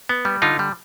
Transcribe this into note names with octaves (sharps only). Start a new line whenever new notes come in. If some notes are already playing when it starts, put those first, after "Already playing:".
B3
G3
D3 D#4 F4
G3